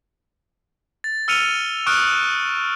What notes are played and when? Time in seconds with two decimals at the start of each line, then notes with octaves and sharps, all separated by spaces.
1.04 A6
1.28 E6 F6 C#7 D#7 F7 G7
1.86 C#6 D#6 F6 F#6 D7